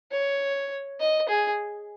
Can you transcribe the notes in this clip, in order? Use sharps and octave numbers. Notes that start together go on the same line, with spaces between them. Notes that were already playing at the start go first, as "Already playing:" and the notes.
C#5
D#5
G#4